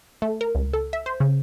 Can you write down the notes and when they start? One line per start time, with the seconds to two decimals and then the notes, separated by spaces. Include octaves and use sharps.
0.22 A3
0.41 A#4
0.55 C#2
0.73 A4
0.93 E5
1.06 C5
1.20 C#3